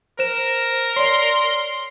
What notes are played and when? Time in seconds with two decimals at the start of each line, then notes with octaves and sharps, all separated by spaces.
0.19 A#4 C5 E7
0.96 C#5 D5 C6